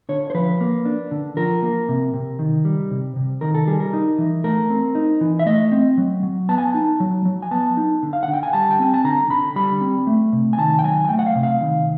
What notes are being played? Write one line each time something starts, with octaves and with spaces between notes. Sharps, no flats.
D3 C#5
C5
F3 B4
A#3
D4
D3
F3 A#4
A#3
C3
C3
D#3
G3
C3
C3
D#3 A#4
A4
G3 G#4
A#4
D#4
E3
A3 A#4
C4
D#4
E3
E5
A3 D#5
C4
F#3
F#3
B3 A5
G#5
A5
D#4
F#3
F#3
G#5
B3 A5
D#4
D3
F5
D3 F#5
G5
G#5
G3 A5
G5
C4 G#5
A5
D3 A#5
D3 B5
G3 B5
C4
A3
C3
G#5
D#3 A5
G5
F#3 G#5
G#5
A3 G5
F#5
F5
C3
F5
D#3